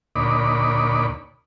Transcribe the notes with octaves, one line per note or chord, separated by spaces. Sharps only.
D2 A#2 D#4 C#5 D5 B5